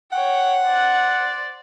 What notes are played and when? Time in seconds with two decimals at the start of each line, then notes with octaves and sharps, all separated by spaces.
0.12 C#5 F#5 G5
0.62 C5 D5